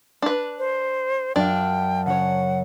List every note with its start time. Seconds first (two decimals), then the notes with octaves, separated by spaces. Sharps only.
0.22 D4 B4
0.59 C5
1.36 F#2 D4 F5 G5
2.06 C#3 C#5 F#5